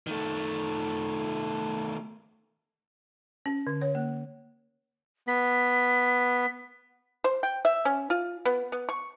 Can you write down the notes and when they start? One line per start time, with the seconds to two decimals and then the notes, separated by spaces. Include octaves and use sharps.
0.07 D#3 A3
3.46 C#4
3.67 D3
3.81 C#5
3.95 A#3
5.27 B3 B6
7.24 C5
7.43 G5
7.65 E5
7.85 C#4
8.10 F4
8.45 B3
8.72 B3
8.89 C#6